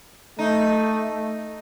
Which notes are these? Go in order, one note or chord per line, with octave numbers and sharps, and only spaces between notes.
A3 D#4